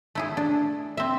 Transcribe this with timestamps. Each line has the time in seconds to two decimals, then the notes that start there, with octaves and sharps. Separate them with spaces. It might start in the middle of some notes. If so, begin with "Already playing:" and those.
0.15 A3 E4 G#4
0.37 D4
0.97 C4 E5